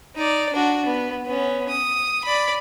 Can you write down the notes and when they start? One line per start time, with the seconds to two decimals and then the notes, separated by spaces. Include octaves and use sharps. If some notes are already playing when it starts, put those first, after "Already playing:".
0.16 D#4 D5
0.53 D4 F#4
0.86 B3
1.26 B3 C#4
1.69 D#6
2.24 D5 B5